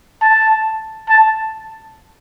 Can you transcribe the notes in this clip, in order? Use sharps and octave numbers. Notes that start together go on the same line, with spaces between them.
A5
A5